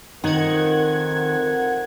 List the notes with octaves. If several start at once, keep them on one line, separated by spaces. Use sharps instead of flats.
F2 D#3 C4 D#4 A#4 F#5 G#6